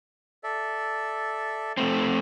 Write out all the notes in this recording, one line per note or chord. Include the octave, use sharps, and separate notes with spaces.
A4 D5 E5
F2 A3 C4